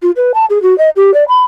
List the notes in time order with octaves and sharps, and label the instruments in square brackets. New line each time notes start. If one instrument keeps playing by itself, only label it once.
[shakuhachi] F4
B4
A5
G#4
F#4
D#5
G4
D5
B5